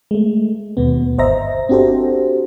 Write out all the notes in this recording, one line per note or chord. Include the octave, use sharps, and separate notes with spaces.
G#3 A3
D#2 B2 B3
G1 C5 D#5 E5 A#5 A#6
C4 D4 F#4 G4 A4 C5